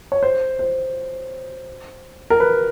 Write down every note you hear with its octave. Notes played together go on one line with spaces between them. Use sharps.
C#5
C5
C5
A#4
B4